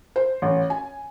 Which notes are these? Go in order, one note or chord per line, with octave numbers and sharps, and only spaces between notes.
C5
A1
G#5